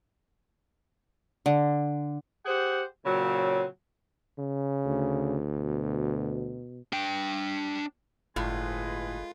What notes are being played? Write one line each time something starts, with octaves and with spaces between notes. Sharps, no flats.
D3
G4 G#4 C5 F#5
A#2 C#3 F#3 C4
C#3
D2
B2
D4 G5
G1 A2 G#3 F4 B4